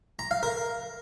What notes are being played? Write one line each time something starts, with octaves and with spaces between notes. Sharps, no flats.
A#5
F5
A#4